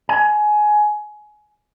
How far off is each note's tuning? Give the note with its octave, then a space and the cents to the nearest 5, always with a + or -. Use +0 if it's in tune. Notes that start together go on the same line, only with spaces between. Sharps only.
G#5 +20